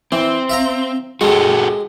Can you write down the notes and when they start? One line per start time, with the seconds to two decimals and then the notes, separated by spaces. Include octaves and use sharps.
0.12 E3 C4
0.49 E5 F5 A#5
1.21 G#3 F#4 G4 A4